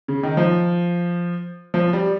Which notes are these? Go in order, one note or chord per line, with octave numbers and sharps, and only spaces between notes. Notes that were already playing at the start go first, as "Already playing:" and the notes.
C#3
D#3
F3
F3
G3